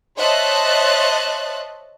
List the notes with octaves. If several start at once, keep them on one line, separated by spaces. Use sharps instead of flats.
C5 C#5 D#5 E5 A5 F#6